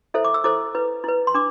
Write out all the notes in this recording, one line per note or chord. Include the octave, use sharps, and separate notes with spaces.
E4 A4 C5 E5
D6
E6
E4 A4 C5 D6
E4 B4
E4 B4
C6
D4 D6